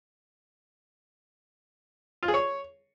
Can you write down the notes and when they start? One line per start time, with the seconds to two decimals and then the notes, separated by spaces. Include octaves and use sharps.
2.23 F4
2.28 G#4
2.34 C#5